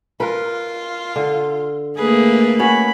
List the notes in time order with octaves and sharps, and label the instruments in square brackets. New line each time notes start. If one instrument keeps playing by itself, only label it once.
[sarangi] F4 [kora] A#4 B4
[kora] D3
[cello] A3 A#3 [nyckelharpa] G#4 [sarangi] B4
[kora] C#4 F#4 C#5 [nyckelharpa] B5